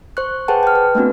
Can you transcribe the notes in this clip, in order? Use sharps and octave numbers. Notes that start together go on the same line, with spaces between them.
C5 C#6 F#6
G#4 B4 C5 F#5 G5 A5
G5 F6
B4
A3 B3 C4 D4 F#4